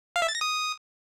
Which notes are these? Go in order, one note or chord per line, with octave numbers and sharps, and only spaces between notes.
F5
E5
A6
A#6
D#6